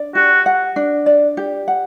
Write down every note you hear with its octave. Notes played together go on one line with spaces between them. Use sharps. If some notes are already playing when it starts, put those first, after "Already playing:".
Already playing: D4 D5
F#4 G4
F#5
D4
D5
G4
F#5